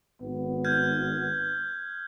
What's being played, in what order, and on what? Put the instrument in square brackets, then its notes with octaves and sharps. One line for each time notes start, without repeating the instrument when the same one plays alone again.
[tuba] G#1 [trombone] B3
[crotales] F6 G6 G#6